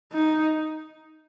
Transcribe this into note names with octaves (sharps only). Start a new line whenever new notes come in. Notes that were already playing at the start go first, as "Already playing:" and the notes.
D#4